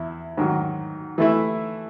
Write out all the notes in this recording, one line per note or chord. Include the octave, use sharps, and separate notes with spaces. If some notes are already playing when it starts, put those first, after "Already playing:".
Already playing: E2 E4
G#2 D#3 F#3
E3 A3 E4